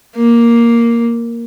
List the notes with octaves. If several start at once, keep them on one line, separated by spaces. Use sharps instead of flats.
A#3